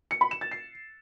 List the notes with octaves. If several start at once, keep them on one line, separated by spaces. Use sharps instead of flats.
C#7
B5
E7
A6
C7